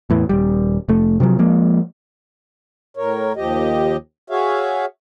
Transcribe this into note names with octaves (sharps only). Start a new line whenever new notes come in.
E2 A2 E3
D#1 G3
F1 A3
C3 D#3 F3 F#3
F3 G#3 A#3
A2 A#4 C#5
D#2 F3 G4 D#5
F#4 G#4 C#5 E5 F5